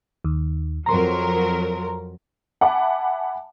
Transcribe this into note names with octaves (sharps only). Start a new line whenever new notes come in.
D#2
F2 F#3 A#4 A#5 C6
E5 F#5 G#5 A5 B5 D6